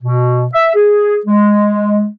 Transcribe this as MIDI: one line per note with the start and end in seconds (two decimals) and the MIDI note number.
0.03 0.47 47
0.54 0.72 76
0.75 1.19 68
1.26 2.07 56